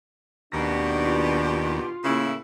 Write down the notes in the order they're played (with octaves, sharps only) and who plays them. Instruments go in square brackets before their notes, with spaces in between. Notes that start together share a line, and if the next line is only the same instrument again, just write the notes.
[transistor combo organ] D#2 [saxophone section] B2 G4 [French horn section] D#3 D4 [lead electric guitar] A3 A#5
[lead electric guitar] F4
[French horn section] A2 A#3 [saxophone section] C#3 E4